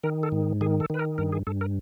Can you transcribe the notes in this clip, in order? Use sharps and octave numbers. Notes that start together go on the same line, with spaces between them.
D#3 A#4
A4
G#2
D#3 G#4
A4
D#3 B4
A#4
G2 A#4
G#4
G2 A4
A#4